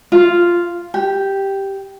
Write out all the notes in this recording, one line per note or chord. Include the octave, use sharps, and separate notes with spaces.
F4
G4